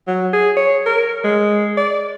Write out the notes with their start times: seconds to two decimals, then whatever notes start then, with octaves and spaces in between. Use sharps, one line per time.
0.07 F#3
0.33 G#4
0.57 C#5
0.86 A#4
1.24 G#3
1.77 D5